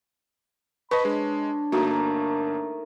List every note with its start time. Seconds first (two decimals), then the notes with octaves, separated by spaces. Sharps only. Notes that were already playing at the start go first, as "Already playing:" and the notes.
0.91 B4 C#5 D#5 A5 B5 C#6
1.05 G#3 D4
1.72 G1 A3 A#3 D#4 F#4 A#4